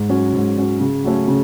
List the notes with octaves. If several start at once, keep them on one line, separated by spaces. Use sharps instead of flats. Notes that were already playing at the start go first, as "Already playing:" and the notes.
Already playing: G#2
F#3 C#4
G#2
F#3 C#4
C#3
F#3 A3 C#4
C#3